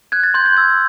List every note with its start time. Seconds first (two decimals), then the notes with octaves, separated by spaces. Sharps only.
0.12 F#6 G#6
0.23 A6
0.34 C6 G6
0.46 G6
0.57 E6 G#6